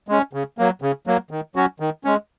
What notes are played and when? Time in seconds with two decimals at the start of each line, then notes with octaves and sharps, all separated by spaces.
0.08 G#3 C#4
0.33 C#3
0.58 F#3 A#3
0.82 C#3
1.07 F#3 A#3
1.31 D#3
1.56 F#3 C#4 F#4
1.80 D#3
2.04 G#3 C#4